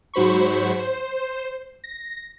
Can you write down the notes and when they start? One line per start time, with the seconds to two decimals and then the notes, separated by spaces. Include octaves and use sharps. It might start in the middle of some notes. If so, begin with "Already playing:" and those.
0.14 G#2 F#3 C5 B5 C#6
0.79 C5
1.84 A#6